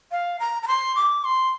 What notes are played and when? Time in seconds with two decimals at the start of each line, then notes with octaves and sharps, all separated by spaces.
0.12 F5
0.40 A#5
0.63 A#5
0.68 C6
0.96 D6
1.24 C6